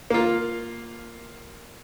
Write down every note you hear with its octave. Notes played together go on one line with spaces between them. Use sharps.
A#3 F4